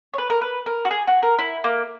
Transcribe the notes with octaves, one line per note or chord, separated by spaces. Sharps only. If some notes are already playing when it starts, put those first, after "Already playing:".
C#5
B4
A#4
B4
A#4
F#4
G#4
F#4
A#4
E4
A#3